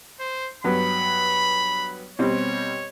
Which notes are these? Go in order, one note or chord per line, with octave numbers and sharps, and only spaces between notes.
C5
G2 F#3 B3 B5
B2 G3 C4 C#5